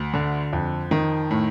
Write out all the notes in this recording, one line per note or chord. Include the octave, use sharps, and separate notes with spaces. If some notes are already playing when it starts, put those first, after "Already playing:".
Already playing: D2
D3
F2
D#3
A2